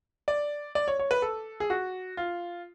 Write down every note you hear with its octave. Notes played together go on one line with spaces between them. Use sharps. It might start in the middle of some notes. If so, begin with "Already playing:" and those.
D5
D5
C#5
C#5
B4
A4
G#4
F#4
F4